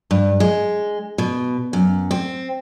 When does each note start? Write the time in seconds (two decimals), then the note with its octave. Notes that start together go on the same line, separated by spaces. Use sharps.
0.11 G2
0.40 G#3
1.18 B2
1.73 F#2
2.11 C4